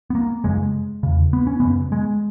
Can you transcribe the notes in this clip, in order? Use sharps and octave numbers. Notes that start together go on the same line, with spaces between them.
B3
A#3
F#2 C#3 G#3
E2 C#3
B3
C#4
F#2 C#3 B3
G#3